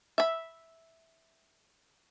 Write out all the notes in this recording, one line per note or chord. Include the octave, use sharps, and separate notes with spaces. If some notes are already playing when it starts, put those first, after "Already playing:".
E5 B5